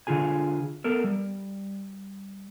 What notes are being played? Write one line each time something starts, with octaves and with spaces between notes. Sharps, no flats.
D3 D4 F4 G#4 G#5
B3 A4 A#4
G3